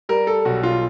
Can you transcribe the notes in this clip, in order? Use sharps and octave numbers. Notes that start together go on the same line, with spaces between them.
G3 A#4
A4
B1 F#4
F4